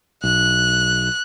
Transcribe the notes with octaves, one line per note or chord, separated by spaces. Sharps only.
B1 F#6